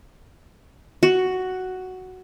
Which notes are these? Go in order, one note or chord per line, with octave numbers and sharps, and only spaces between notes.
F#4